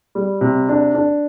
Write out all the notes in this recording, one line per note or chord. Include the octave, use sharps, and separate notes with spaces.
G3
C3
D4
D4